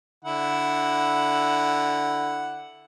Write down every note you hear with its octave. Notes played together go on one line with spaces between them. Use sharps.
D3 E4 F#5